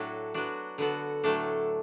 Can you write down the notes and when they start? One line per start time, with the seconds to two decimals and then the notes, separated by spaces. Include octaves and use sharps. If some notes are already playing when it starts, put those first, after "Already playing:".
Already playing: A2 F#3 D4 F#4 A4
0.34 F#3 B3 D4 F#4
0.78 D3 B3 F#4 A4
1.24 A2 F#3 A3 D4 A4